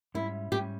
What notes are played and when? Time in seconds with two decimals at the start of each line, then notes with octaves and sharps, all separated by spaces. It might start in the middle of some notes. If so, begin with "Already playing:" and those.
0.15 G#2 G3 C#4 E4
0.52 G#2 G3 C#4 G4